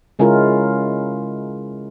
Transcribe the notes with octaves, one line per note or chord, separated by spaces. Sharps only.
C#3 G#3 C#4 E4 F4 A#4